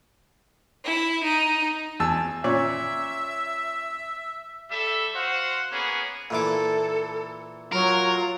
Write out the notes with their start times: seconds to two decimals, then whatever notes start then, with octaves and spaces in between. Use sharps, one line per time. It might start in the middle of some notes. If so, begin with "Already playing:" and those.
0.85 E4
1.24 D#4
2.00 E2 A5 E6
2.44 A#2 C#4 D5 E5
4.71 G3 A4 E5
5.14 F#4 C5 F5 F#5
5.71 A#3 B3 C#4 G#4
6.30 A#2 E3 A4 D6
7.72 F#3 F4 A#4